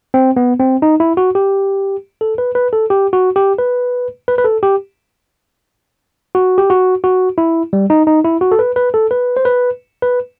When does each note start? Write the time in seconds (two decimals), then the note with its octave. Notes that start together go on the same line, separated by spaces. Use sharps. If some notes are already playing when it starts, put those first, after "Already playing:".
0.14 C4
0.36 B3
0.60 C4
0.82 D#4
1.00 E4
1.17 F#4
1.35 G4
2.21 A4
2.38 B4
2.55 B4
2.73 A4
2.90 G4
3.13 F#4
3.36 G4
3.59 B4
4.28 B4
4.38 B4
4.45 A4
4.63 G4
6.35 F#4
6.58 G4
6.70 F#4
7.04 F#4
7.38 E4
7.73 G3
7.90 D#4
8.07 D#4
8.24 E4
8.41 F#4
8.52 A4
8.59 B4
8.76 B4
8.94 A4
9.11 B4
9.37 C5
9.45 B4
10.02 B4